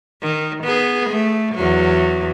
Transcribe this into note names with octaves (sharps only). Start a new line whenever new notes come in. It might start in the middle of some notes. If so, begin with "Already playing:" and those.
D#3
B3 G#4
A3
E2 F#3